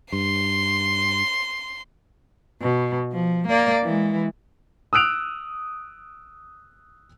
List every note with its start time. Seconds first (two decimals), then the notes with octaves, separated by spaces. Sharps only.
0.12 G2 C6
2.61 B2
3.12 F3
3.48 A#3 D5
3.83 E3 G#3
4.93 D#6 E6 F#6 D7 F7